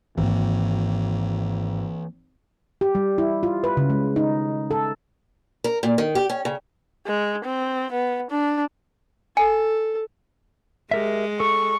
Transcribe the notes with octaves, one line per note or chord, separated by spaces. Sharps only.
G#1 E3 A#3
G4
G3
E4
F4
B4
C#3
G#3
D#4
A4
A#4
A#2
D#3
G4
C#4
C#3
G#3
C4
B3
D4
A4 G#5
G#3 G4 A#4 E5
A4 C#6